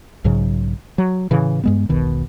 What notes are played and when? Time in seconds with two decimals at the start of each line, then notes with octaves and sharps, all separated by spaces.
0.24 B1 G#2 C#3 F#3
0.98 F#3
1.31 A2 C#3 E3
1.64 G2 G#3 B3
1.89 E1 B1 B2 D#3